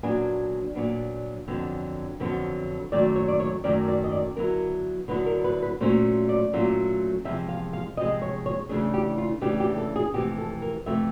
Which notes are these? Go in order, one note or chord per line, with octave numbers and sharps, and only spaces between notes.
A#2 F#3 B3 D4 G#5
A#2 F#3 B3 D4
F2 D3 F#3 B3
F2 D3 F#3 B3
F#2 D#3 F#3 A3 D5
C#5
D5
C#5
F#2 D#3 F#3 A3 D5
D5
D#5
D5
D3 F#3 B3 E4 A#4
D3 F#3 B3 E4 B4
A#4
B4
B4
A#2 F#3 A3 C#4 F4 C5
D5
A#2 F#3 A3 C#4 F4
E2 C3 F3 G#3 E5
F5
F5
E2 C3 F3 G#3 D#5
C#5
C#5
C#3 E3 A3 D4 G#4
G4
F4
C#3 E3 A3 D4 G4
G4
A4
G#4
F2 C3 E3 A3 G4
A4
A#4
F2 C3 E3 A3 E5